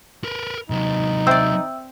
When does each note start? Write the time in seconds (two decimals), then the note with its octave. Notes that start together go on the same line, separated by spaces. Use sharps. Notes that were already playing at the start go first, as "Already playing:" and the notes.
0.24 A#4 B4
0.70 C3 F#3 D#4
1.27 C4 D5 E5 G5 E6